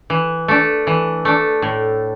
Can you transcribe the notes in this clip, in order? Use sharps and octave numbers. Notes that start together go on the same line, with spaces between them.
E3
A3 D4
E3
A3 D4
A2